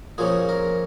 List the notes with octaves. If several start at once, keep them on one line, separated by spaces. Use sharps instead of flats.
A#2 F3 A#3 C#4 G#4
A#4